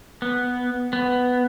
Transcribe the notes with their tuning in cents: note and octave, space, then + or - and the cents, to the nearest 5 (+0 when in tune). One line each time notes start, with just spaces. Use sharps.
B3 +0
B3 +10